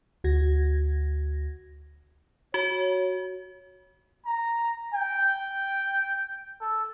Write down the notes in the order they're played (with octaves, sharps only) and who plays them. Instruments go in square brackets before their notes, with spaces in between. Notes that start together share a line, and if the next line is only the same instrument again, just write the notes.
[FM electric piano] D2 F#4 G#6 A#6
[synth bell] F#4 [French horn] C#5
[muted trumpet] A#5
G5
A4